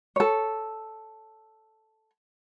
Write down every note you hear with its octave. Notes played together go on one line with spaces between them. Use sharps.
A4 C#5